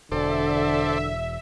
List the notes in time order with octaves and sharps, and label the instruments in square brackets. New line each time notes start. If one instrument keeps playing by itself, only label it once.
[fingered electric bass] E1 [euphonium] D3 [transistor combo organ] A4 C5 D5 [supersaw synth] E5